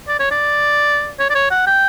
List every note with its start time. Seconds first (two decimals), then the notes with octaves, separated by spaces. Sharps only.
0.08 D5
0.20 C#5
0.31 D5
1.20 C#5
1.30 D5
1.35 C#5
1.51 F#5
1.67 G5